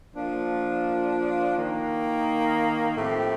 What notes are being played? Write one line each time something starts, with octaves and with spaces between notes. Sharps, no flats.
F3 A#3 D4 F4
D#3 A#3 D#4
A2 F3 A3 C4 G4